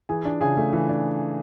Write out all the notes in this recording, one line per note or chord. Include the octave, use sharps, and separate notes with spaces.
E3 G#4 G#5
D4
C#3 G#4 G#5
A3
E3
D4